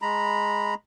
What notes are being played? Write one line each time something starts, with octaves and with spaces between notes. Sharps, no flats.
G#3 A#5 B5